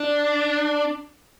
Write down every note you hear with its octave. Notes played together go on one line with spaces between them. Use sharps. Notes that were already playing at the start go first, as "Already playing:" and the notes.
Already playing: D4